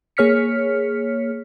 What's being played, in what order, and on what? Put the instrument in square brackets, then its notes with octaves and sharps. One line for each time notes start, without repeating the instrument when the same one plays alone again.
[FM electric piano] A#3 G#4 C#5 F6 B6 C#7